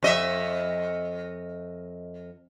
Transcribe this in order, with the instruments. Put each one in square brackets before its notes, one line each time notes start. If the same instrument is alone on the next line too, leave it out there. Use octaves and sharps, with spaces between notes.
[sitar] F2 D#5 E5